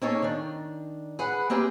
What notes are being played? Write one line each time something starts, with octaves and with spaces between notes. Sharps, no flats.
A#3 C#4 D#4 G#4 A4 C#5
D#3 D4
G#4 B4 F#5
A#3 C4 G4 G#4 B4